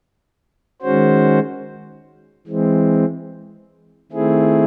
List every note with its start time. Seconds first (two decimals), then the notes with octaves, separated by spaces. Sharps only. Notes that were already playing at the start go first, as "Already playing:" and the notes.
0.82 D#3 G#3 C#4 F#4 C5
2.47 E3 G#3 C4
4.12 D#3 A3 C4 E4 G#4